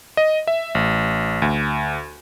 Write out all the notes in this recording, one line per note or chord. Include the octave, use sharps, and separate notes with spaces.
D#5
E5
A1
D2